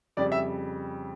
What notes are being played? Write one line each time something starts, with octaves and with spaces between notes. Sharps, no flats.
F2 C#3 G3 D5
E5